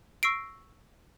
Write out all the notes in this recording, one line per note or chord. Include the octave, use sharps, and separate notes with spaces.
C#6 E6 A#6 C7 D7